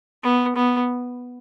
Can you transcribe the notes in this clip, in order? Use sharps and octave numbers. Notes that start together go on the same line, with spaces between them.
B3
B3